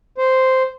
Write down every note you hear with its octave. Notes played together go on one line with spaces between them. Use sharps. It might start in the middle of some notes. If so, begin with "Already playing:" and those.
C5